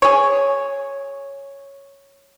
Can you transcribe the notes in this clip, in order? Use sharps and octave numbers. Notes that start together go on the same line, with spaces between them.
G#4 C#5